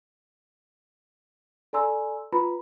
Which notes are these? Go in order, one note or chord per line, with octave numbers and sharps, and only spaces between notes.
A4 D5 G#5 A#5 C6 E6
F4 B4 A#5 B5